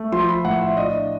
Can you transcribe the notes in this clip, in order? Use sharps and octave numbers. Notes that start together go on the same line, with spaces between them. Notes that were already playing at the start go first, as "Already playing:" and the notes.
Already playing: A3
F3 C6
B5
A2 F#5
E5
D4 D#5